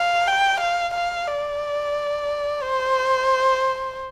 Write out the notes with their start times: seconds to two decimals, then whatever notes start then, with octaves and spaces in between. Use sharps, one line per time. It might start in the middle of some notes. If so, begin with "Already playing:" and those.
Already playing: F5
0.27 G5
0.60 F5
0.94 F5
1.27 D5
2.63 C5